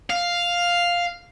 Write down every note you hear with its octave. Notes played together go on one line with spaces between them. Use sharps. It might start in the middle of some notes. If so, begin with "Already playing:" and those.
F5